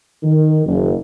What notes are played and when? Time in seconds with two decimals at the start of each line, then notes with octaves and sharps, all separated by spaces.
0.23 D#3
0.66 F#1